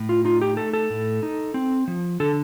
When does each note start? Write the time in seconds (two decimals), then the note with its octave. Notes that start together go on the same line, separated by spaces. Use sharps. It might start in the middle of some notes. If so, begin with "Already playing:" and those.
Already playing: A2
0.09 F4
0.25 D#4 F4
0.41 G4
0.57 A3 A4
0.73 A4
0.90 A2
1.23 D#4
1.54 C4
1.88 F3
2.20 D3 A4